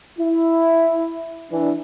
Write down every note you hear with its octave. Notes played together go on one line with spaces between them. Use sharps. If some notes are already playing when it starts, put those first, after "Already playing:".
E4
E3 D4